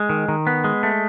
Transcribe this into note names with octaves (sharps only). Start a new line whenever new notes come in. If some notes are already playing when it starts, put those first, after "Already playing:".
Already playing: G#3
D#3
D#3
B3
G#3
A3